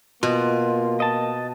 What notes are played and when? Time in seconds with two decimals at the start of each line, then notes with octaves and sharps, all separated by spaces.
0.23 B2 A#3 F4
1.00 D#5 A5